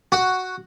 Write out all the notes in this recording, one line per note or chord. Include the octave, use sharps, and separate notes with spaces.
F#4